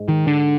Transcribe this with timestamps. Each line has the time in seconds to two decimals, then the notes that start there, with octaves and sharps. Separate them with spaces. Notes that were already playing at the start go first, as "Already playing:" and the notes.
Already playing: G#2
0.08 D#3
0.27 D3